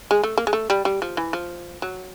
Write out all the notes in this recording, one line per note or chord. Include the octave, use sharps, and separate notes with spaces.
G#3
A3
A#3
G#3
A3
G3
G3
F3
E3
F3
F#3